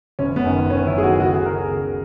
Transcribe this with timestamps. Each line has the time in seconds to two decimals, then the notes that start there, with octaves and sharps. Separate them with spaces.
0.19 F#1 C#4
0.36 B3
0.44 F#2 D#3
0.70 F#1 C#4
0.87 E4
0.95 F#2 D#3 G#4
1.03 F#4
1.20 C#2 F#4
1.33 G#4
1.46 B2 A#4
1.58 G#4
1.71 C#2